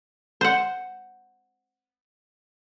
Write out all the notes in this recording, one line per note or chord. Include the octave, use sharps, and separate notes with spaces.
C5 F#5